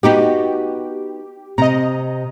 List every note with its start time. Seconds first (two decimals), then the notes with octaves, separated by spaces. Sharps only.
0.03 B3 D#4 F#4 G4
1.58 C3 D#5 A#5